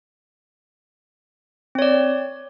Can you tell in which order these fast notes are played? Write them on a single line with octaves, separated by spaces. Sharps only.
C4 C#5 D5